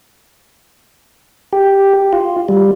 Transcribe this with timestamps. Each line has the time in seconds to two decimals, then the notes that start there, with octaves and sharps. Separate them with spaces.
1.53 G4
2.13 F4
2.49 G3